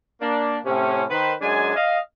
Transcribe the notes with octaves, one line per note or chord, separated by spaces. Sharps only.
A#3 D4
A2 C3 C#4
D#3 B4 C5
F#2 G#3 D4 G#5
D#5 F5